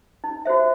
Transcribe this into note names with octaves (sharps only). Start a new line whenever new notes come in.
D#4
F#4 C5 E5